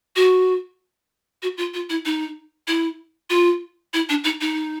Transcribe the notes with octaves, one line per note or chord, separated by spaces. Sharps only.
F#4
F#4
F4
F4
E4
D#4
E4
F4
E4
D4
D#4
D#4